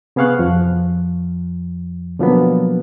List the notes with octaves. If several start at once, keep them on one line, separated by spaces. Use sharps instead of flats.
C3 B3 G#4 F5 C#6 F#6
F2 F3
B2 D3 F3 F#3 A#3 B3